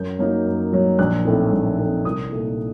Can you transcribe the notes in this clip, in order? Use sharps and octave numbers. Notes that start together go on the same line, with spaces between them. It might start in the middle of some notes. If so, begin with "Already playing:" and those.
Already playing: F#2 G6
F#3 A#3 D#4
F#2
F#3 A#3 D#4
A#1 F#6
A2 A3 C4 D#4
A#1
A2 A3 C4 D#4
C2 D#6
A#2 A3 D#4